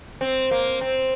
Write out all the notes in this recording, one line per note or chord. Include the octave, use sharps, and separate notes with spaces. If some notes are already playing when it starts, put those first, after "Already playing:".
C4
A#3
C4